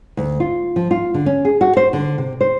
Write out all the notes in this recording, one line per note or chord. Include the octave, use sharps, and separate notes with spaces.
D2
F4
F3
F4
D3
C#4
G#4
F#4
C5
D3
C3
C5